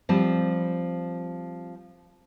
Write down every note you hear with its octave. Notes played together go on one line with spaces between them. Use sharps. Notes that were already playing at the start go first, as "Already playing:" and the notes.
F3 G3 C4